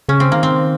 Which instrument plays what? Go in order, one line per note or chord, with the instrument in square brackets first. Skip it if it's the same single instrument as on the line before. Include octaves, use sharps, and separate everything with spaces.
[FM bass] C#3 [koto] C#4
[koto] C4
[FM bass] D#3 [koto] A#3
[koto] C4